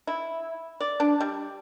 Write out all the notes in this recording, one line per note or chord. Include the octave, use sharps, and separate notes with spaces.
E4
D5
D4
G3